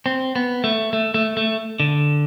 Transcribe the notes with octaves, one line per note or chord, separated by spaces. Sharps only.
C4
B3
A3
A3
A3
A3
D3